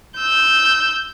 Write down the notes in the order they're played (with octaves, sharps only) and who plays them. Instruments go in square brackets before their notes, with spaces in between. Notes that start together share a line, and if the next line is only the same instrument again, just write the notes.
[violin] E6 G6